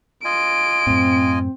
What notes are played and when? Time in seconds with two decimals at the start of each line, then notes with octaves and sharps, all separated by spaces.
0.25 F4 D#5 G#5 D7
0.87 F#2 A2 C4